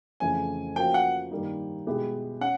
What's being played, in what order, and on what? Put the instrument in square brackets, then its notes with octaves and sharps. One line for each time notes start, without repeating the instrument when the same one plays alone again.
[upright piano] F2 C#3 E3 A3 [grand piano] G#5
[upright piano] F3 A#3 C#4 F#4 [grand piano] G5
[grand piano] F#5
[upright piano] G2 D#3 G3 A#3 D#4
B2 G#3 B3 E4 G4
[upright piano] C#4 [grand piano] F#5